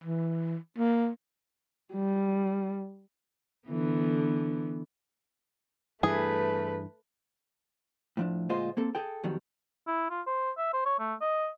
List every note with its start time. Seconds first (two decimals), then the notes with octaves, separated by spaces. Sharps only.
0.04 E3
0.78 A#3
1.93 G3
3.68 D3 E3 B3
6.03 G2 E3 A3 G#4 B4
8.17 A2 F3 D4
8.49 D2 A#2 G#3 F4 C5 D#5
8.77 A#3 C4 A4
8.95 G#4 A4 G5
9.23 F2 B2 D#3 F#3 G3
9.87 E4
10.10 F4
10.27 C5
10.57 E5
10.73 C5
10.85 C#5
10.99 A3
11.21 D#5